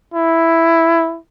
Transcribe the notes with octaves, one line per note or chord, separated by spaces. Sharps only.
E4